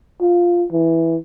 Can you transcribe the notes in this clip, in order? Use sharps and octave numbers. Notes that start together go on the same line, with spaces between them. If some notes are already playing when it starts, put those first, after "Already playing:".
F4
E3